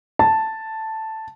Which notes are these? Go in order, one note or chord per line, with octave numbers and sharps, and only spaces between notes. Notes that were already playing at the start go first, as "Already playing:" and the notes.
A5